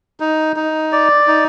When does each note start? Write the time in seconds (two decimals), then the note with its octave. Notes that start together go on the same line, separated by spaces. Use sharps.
0.20 D#4
0.56 D#4
0.92 D5
1.28 D#4